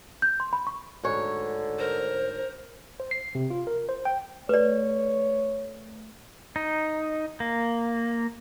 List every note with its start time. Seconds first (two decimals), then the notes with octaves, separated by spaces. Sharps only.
0.22 G6
0.40 C6
0.53 B5
0.67 C#6
1.03 D2 G#2 D3 C#5
1.78 A#4 C5
3.00 C5
3.11 C7
3.35 C3
3.50 F4
3.67 A#4
3.89 C5
4.05 G5
4.49 A3 B4 C#5 D5
6.56 D#4
7.40 A#3